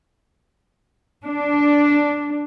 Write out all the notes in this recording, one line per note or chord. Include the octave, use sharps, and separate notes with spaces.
D4